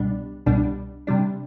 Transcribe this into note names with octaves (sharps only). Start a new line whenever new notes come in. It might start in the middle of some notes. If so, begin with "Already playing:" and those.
Already playing: C2 B2 G3 D4
C2 B2 G3 D4
C3 G3 D4